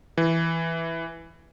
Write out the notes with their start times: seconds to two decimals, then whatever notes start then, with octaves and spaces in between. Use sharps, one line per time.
0.17 E3